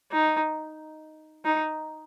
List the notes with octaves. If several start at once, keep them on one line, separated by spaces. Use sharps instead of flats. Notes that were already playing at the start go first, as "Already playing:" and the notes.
D#4
D#4